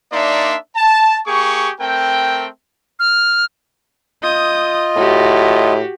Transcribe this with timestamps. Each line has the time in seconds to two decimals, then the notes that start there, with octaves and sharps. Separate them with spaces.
0.12 A#3 D4 D#4 D5 E5 C6
0.76 A5
1.26 A#3 G4 G#4 C#6
1.80 A3 C4 A#4 G5
2.99 F6
4.23 F4 D#5 D#6 G6
4.96 A2 F#4 G4